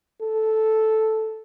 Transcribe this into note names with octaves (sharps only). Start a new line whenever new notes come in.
A4